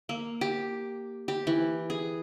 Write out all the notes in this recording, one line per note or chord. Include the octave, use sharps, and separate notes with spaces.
A#3
G4
G4
E3
G#4